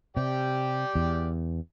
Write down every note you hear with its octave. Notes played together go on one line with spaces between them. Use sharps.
C3 G4 D5 G5
E2